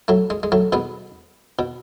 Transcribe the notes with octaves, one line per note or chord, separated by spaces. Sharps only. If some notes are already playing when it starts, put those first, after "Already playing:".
F#3 A3
G#3
G#3
F#3 A3
B2 G#3 B3
B2